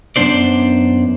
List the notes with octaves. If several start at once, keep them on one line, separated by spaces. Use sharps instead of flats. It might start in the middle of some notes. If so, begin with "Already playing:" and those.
F#2 B3 D4 C5 D5